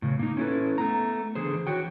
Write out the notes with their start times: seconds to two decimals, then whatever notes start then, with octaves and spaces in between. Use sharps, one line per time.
0.02 A2 C#3
0.19 A#3 D#4
0.37 C#4 E4 A4 B4
0.78 A3 B3 A#5
1.35 D3 E3 G#4 C5
1.67 E3 F#4 C#5 G5